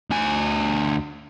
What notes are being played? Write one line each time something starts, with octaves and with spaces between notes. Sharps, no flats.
D2 G#5